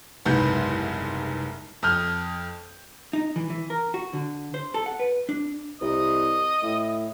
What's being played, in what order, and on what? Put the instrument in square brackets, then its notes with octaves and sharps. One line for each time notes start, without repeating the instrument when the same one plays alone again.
[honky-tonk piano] F#1 C2 G#2 B3 G6
F2 D#6 F6 G6
[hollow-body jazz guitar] D#4
E3
E3
A#4
F#4
D3
C5
A4
F#5
B4
D4
[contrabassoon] C2 [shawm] D#5
[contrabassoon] A2